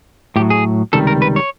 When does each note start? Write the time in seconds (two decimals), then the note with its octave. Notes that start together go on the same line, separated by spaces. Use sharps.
0.36 A2 G4
0.40 F#3
0.50 G#4
0.93 C#2 C3 D#3 G3 A4
1.07 A#4
1.22 B4
1.36 C#5